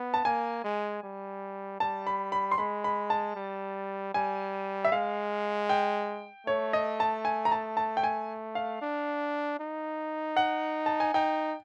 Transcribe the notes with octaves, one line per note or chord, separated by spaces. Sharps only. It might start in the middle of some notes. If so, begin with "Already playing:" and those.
Already playing: B3
A5
A#3 G#5
G#3
G3
G3 A5
B5
B5
C6
G#3 B5
B5
A5
G3
G3 G#5
E5
G#3 F5
G5
A3 C#5
D#5
A5
G#5
A#5
A5
A5
G5
G#5
F5
D4
D#4
F#5
A5
G#5
D#4 G5